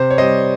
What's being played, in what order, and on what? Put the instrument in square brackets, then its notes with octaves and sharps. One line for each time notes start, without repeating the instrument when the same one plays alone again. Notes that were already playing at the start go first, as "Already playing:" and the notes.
Already playing: [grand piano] C3 C5
C#5
G3 C4 C5 D#5